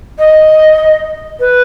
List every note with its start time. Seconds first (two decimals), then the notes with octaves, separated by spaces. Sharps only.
0.19 D#5
1.40 B4